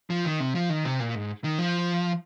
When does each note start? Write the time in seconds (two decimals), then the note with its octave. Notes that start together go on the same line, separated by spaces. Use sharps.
0.10 F3
0.25 D#3
0.40 C3
0.55 F3
0.69 D#3
0.85 C3
1.00 A#2
1.15 G#2
1.44 D#3
1.59 F3